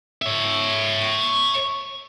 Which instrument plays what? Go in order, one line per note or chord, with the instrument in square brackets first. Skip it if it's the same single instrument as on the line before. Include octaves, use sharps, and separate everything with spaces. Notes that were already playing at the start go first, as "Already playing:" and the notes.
[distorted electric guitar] C#5 E5